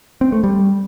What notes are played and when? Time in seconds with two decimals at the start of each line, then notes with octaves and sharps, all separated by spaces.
0.21 C4
0.32 A3
0.44 G3